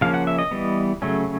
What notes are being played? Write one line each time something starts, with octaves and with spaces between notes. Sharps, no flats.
C#3 F3 A#3 C#4 F5
F#5
E5
D#5
E3 G3 B3
C#3 F#3 A3 C#4